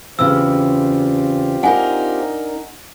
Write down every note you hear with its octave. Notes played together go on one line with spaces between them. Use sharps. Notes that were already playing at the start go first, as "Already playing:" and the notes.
E2 C#3 C4 F4 G4 E6
D4 D#4 A#4 F#5 G#5